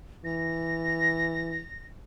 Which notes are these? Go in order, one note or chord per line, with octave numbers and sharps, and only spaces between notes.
E3 A#6